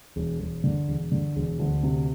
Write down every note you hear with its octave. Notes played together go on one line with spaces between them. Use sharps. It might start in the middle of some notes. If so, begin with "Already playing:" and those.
E1
E1
D3
E1
D3
E1
D2
C3